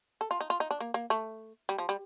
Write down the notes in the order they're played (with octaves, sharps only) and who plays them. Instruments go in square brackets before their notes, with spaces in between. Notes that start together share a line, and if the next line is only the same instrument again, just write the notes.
[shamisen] A4
F4
D#4
F4
D#4
D4
A#3
A#3
A3
G3
F3
G3